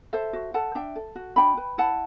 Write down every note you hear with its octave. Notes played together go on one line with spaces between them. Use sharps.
A4 C5 E5
F#4
A4 F#5 A5
D4 E5 G5
A4
F#4
D4 G5 B5
B4
E4 F#5 A5